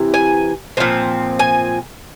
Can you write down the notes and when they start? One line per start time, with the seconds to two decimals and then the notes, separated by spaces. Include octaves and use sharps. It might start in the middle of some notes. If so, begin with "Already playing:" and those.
Already playing: C3 E3
0.14 G#5
0.77 A#2 F3 G#3 C4
1.39 G#5